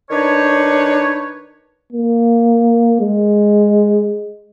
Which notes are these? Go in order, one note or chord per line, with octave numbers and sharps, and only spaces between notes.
D#3 D4 D#4 B4 C#5
A#3
G#3